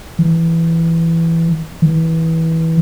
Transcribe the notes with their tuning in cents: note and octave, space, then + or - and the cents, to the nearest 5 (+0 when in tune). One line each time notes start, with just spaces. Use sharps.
E3 +5
E3 -20